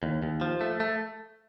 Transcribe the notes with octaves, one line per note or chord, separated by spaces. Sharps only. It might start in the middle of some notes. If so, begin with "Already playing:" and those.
D#2
D#2
F3
A3
A3